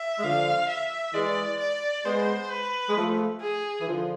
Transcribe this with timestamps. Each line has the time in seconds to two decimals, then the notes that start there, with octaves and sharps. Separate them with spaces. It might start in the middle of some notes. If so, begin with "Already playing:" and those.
Already playing: E5
0.18 G#3
0.23 D3 F3 F5
0.69 E5
1.14 E3 G#3 D5
1.60 D5
2.05 G#3 B3 C5
2.50 B4
2.89 G#3
2.96 F3 A3
3.41 G#4
3.80 E3
3.87 D3 F3